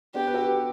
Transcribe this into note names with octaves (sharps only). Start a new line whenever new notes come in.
B3 D4 G4
B4
F#4 A4
G4 B4